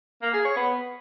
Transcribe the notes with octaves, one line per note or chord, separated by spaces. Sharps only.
A#3
G#4
C#5
B3